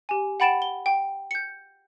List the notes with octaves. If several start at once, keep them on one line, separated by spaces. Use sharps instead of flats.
G4 G#5
F#5 G5 B5 A6 D7 E7
G7
G5
G6 C#7